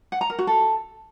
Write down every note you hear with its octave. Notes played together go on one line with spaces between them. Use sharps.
F#5
A#5
A#4
F#4
A4